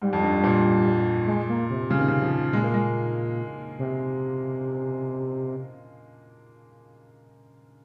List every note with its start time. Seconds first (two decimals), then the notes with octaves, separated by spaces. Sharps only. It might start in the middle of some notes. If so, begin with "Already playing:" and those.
0.02 G#2 G3
0.13 F2
0.23 G2
0.44 A#2
1.27 G#3
1.49 A#3
1.70 C3
1.90 C#3
1.99 D#3
2.08 C#3
2.22 F3
2.53 A#2 G#3
2.64 A#3
2.74 G#3
3.79 C3